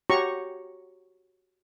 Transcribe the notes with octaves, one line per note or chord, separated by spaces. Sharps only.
F#4 G4 C#5 A#5 C#6